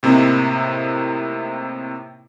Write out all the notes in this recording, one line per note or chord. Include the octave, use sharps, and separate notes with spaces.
A2 C3 A#3 C4 D#4 E4